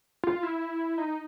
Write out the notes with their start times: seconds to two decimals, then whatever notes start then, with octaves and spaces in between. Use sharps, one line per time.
0.24 F4
0.43 E4
0.98 D#4